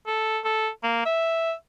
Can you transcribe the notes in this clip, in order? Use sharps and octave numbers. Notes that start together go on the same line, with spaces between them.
A4
A4
A#3
E5